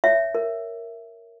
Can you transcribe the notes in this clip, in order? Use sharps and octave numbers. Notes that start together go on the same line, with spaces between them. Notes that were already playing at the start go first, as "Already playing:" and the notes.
C#5 E5
A#4